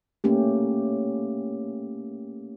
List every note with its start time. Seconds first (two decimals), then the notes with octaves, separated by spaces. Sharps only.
0.24 A3 A#3 C#4 G4